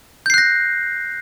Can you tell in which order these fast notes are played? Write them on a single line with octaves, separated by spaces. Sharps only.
G6 C7 F#6 A#6